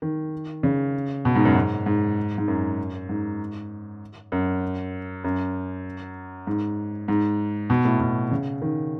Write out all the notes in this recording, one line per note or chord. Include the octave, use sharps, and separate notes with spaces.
D#3
C#3
B2
G#2
F#2
G#2
G#2
G#2
F#2
G#2
F#2
F#2
G#2
G#2
B2
A2
B2
C#3
D#3